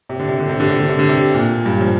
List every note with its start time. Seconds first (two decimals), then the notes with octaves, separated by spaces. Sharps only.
0.09 C3
0.19 D3
0.29 C3
0.39 D3
0.49 C3
0.60 D3
0.69 C3
0.79 D3
0.89 C3
0.99 D3
1.09 C3
1.34 A#2
1.66 G2
1.81 F3